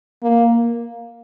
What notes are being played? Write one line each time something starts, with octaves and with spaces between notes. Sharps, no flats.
A#3